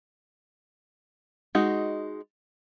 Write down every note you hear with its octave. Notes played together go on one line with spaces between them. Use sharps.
G#3 D#4 F#4